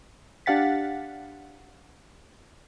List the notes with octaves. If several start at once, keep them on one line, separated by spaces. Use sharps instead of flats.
D4 G4 F5 F#5 A6 B6